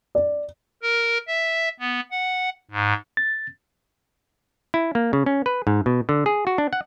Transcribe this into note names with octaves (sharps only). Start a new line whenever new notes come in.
D5
A#4
E5
B3
F#5
G#2
A6
E4
A#3
C#3
C#4
B4
G#2
B2
D3
G#4
F#4
D4
F#5